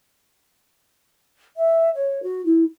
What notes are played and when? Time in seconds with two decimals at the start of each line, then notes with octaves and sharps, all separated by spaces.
1.57 E5
1.95 C#5
2.23 F#4
2.46 E4